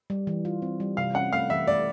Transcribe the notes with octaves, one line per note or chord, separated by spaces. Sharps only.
G3
E3
F4
C4
G3
C3 F5
C#4 F#5
A3 F5
E3 E5
A3 D5